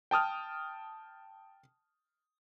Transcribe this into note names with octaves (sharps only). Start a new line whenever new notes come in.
G5 A5 D#6 F6